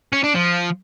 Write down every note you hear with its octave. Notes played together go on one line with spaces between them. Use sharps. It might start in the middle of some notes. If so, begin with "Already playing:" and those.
C#4
D4
F3